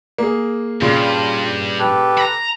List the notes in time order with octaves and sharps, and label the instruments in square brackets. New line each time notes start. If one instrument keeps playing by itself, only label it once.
[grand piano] A#3 G#4
[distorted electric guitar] G2 [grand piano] A#2 C#3 [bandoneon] F4
[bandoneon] G4 A4 B4
[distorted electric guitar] A#5 B5